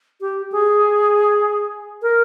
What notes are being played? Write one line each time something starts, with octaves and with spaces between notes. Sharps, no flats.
G4
G#4
A#4